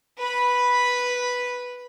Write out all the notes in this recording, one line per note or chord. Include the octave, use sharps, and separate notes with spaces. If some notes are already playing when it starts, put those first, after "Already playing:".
B4 B5